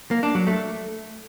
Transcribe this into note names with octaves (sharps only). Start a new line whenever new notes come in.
A#3
D4
F#3
A3